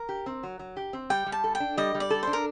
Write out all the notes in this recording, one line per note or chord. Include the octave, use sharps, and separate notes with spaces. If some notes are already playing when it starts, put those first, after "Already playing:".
Already playing: A#4
G4
C4
F#3
F#3
G4
C4
G3 G5
G3
A5
A4
G5
D4
G3 D#5
G3
D5
A4
D4 C5
A#4